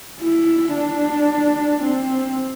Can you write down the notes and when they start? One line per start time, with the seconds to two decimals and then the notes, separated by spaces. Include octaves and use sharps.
0.22 E4
0.75 D4
1.84 C4